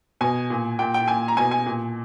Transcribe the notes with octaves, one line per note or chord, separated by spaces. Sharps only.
B2 G#5
A#2
A#2 G5
G5
A#2 G#5
A#5
B2 G#5
G#5
A#2